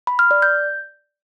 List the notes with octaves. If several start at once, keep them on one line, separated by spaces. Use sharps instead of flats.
B5
F6
D5
G6